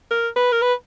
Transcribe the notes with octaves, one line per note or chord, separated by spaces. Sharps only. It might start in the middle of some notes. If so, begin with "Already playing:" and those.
A#4
B4
A#4
B4